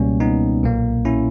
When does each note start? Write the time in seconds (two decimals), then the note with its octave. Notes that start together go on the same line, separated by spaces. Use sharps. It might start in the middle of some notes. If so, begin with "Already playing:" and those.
Already playing: C#2 B2 G3 A#3 C#4
0.20 B3 D#4
0.63 B1 A#2 A#3
1.05 C#4 E4